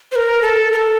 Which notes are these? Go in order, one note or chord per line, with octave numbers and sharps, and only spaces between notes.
C5
A#4
A4
A#4
A4